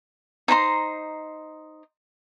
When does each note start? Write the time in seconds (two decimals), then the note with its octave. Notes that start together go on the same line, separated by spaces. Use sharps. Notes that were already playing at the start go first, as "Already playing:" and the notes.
0.48 D#4 C5 A#5 C6